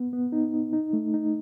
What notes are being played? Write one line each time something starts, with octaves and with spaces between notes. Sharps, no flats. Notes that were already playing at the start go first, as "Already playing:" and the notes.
Already playing: B3
B3
D#4
D#4
D#4
A3
D#4